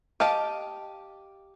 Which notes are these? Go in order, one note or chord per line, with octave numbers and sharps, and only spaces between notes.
G4 D#5 F5 A5